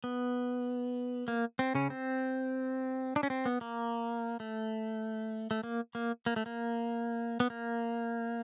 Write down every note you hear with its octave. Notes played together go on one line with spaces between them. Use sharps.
B3
A#3
C4
C#3 C#4
C4
D4
C#4
C4
B3
A#3
A3
A3
A#3
A#3
A#3
A3
A#3
B3
A#3